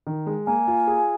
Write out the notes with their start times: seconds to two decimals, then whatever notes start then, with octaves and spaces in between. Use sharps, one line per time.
0.07 D#3
0.27 G#3
0.46 A#3 G#5
0.68 F4
0.87 G#4